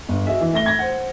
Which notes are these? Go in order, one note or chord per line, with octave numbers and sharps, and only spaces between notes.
G1
F#4 G#4 D#5 E5
E3
A3 E5 A#6 G7
G#6 A#6
C5 F#5